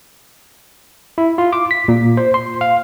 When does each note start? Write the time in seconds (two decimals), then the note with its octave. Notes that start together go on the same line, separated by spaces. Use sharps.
1.18 E4
1.38 F4
1.53 D6
1.71 B6
1.88 A#2
2.17 C5
2.34 C6
2.61 F5